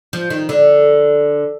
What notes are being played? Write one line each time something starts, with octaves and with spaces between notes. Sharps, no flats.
F3
D#3
D3